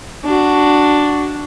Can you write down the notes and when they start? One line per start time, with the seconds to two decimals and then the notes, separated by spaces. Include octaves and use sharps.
0.25 D4 F#4